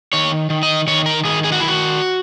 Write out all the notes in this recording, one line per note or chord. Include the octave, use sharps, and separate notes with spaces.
D#3 C#5
D#3
D#5
D#3 C#5
A#4
D#3 G#4
G#4
F#4
D#3 E4
F#4